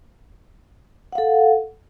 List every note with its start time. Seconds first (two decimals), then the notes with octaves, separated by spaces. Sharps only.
1.13 F#5
1.15 F5
1.18 A4